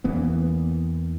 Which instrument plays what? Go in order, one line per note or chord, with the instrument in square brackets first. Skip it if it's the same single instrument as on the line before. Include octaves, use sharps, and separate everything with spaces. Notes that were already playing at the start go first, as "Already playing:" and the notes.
[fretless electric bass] E2 E3 A#3 B3